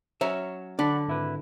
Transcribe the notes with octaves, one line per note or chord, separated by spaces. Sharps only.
F#3 C#4 C#5 E5 A#5
D3 D4 D5 F#5 B5
G#1 E4 B4